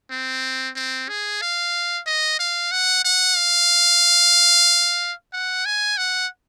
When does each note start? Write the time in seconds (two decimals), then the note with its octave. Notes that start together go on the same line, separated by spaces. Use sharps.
0.11 C4
0.76 C4
1.09 G#4
1.41 F5
2.06 D#5
2.39 F5
2.71 F#5
3.04 F#5
3.37 F5
5.33 F#5
5.65 G#5
5.97 F#5